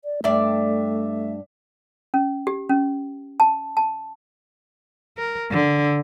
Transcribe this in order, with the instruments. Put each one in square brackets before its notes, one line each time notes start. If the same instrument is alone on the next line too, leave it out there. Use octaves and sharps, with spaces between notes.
[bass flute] D5
[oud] G2 D4 D5 [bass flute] A3 [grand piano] E5
[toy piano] C#4
G4
C#4
A5
A5
[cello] A#4
D3